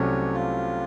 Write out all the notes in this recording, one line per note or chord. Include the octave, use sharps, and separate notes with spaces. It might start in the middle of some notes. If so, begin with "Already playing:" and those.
Already playing: C2 C3 F#3 A3 C#4 C#5
F4